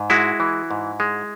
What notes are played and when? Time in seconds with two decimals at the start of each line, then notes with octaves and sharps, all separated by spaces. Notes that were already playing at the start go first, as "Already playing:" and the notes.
Already playing: G#2
0.10 G#3 E4 F#4
0.40 E3
0.71 G#2
1.00 G#3